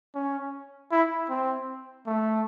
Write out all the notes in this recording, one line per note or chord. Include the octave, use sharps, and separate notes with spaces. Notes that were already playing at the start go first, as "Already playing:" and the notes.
C#4
E4
C4
A3